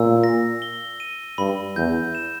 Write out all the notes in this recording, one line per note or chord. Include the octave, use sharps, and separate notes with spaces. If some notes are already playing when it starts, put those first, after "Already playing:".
Already playing: A#2 E6
A#6
G7
D#7
G2 B5
E2 G6
E7